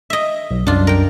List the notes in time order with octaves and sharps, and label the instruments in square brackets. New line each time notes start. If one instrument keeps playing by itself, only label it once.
[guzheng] D#5 E5
[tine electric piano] B1
[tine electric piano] C2 F#2 [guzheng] D4 F4
[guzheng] A#4 G5